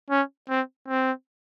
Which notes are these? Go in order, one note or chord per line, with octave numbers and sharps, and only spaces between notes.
C#4
C4
C4